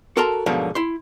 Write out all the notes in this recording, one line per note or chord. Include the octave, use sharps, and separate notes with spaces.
F#4 A4 A#4 A5 A#5 C6
G#2 B2 D3 F3 F#3 A#3
E4 C6